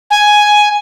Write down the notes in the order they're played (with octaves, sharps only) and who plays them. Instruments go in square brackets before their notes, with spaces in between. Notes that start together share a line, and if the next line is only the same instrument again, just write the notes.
[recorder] G#5